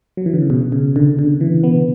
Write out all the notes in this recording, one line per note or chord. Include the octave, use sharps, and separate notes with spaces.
F#3
E3
D3
C#3
B2
C#3
D3
D3
E3
B3